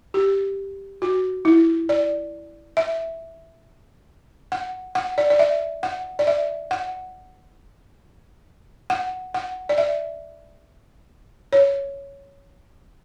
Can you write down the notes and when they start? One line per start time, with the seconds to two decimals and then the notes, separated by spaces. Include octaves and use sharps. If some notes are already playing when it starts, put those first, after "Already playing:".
0.14 G4
1.02 F#4
1.45 E4
1.89 D5
2.77 E5
4.52 F#5
4.95 F#5
5.18 D5
5.30 D5
5.39 E5
5.83 F#5
6.19 D5
6.27 E5
6.71 F#5
8.90 F#5
9.34 F#5
9.69 D5
9.78 E5
11.53 C#5